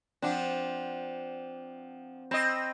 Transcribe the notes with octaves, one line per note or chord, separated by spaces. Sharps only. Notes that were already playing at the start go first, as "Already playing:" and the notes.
F3 C4 D4 F#5
C4 D#5 B5